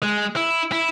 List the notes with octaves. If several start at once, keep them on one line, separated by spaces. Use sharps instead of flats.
G#3
E4
E4